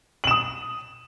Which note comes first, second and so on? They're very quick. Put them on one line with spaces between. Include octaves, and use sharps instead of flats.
F#7 E7 D#6